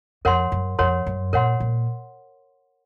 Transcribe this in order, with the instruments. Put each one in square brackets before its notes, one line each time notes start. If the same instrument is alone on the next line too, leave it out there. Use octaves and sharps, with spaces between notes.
[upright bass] F2 [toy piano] A#4 C#5 F#5 C6
[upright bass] F#2
[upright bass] F2 [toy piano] A#4 C#5 F#5 C6
[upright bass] F#2
[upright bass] A#2 [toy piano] A#4 C#5 F#5 C6
[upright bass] A#2